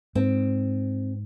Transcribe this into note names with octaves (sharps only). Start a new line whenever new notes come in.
G#2 C4